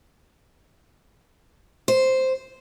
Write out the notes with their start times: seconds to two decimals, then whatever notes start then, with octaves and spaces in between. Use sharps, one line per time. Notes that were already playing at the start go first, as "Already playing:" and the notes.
1.88 C5